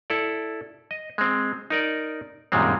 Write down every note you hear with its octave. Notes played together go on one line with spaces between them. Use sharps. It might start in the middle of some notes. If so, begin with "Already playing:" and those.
E4 A4 D5
D#5
G#3 C4
D#4 A#4 D5
F#2 A#2 D#3 G3 G#3 C4